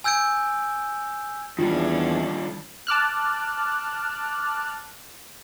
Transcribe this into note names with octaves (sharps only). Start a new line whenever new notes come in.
G#5 E6 G6 G#6 D7
E2 D#3 G3 C#4 D4 F4
A5 D6 F6 F#6